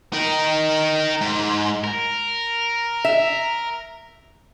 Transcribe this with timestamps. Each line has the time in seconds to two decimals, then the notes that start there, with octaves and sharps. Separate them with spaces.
0.13 D#4 A#4
1.21 G#2
1.84 A#4
3.05 E5